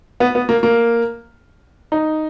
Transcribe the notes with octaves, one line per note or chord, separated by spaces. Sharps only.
B3
B3
A#3
A#3
D#4